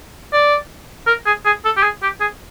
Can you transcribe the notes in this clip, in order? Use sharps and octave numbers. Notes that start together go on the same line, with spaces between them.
D5
A#4
G#4
G#4
A4
G4
G#4
G4
G#4